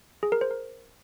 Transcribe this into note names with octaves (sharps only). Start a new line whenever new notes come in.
G#4
A#4
C5
A#4